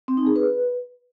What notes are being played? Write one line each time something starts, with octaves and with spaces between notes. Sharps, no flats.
C4
D#4
G#4
B4